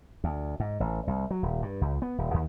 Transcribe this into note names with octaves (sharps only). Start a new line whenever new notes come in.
D2
G#2
A1
C2
F#3
D#1
G2
C#2
B3
D#1
D#2